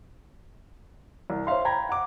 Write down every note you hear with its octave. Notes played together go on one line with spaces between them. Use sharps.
C2
C5 C#5 E5 F5 C6
G5 A#5 B5 G#6 A#6
F#5 D6